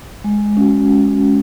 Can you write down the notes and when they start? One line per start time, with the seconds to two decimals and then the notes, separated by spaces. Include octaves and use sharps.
0.24 G#3
0.57 C#4 F#4